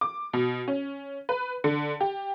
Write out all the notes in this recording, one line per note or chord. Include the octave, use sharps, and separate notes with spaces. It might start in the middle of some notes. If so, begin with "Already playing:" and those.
D6
B2
C#4
B4
D3
G4